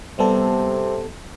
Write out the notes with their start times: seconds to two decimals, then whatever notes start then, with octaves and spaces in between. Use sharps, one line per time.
0.19 C3 G3 B3 A4